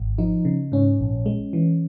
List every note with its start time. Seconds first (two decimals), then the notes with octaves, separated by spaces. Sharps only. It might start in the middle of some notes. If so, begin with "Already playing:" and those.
Already playing: G#1
0.18 F3 D#4
0.45 C#3
0.72 G#2 C#4
0.99 A#1
1.26 G#3
1.53 E3